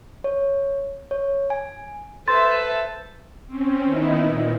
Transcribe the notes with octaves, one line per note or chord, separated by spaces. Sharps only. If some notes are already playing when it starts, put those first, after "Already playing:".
C#5
C#5
G#5
A4 B4 C5 E5 A5 C6 A6
C4 C#4
D#3 B3 D#4 E4
A#2